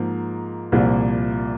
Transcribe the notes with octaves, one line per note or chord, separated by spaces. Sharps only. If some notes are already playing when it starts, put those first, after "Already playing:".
Already playing: G#2 F3 A#3
C2 A#2 F3 A#3